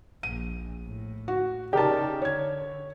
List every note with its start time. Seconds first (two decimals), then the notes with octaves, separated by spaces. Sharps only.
0.23 A#1 D#7
0.85 A2
1.28 F#4
1.73 C#3 D#4 G4 A#4 D5 A5
2.22 D3 C#5 G#6